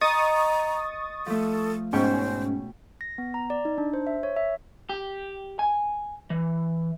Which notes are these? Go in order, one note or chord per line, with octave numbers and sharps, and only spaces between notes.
D#5 A#5 C#6 D#6 A6
F3 A3 A4
G#2 B2 C#4 C5 G5 C#6
A#6
B3
A#5
D5
D#4
D4
C5
E5
C#5
E5
G4
G#5
E3